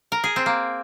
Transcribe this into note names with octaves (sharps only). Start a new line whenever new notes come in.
A#4
G#4
C4
A#3